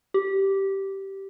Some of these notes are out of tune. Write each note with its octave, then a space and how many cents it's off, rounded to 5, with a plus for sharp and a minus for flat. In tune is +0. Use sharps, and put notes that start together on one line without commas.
G4 -10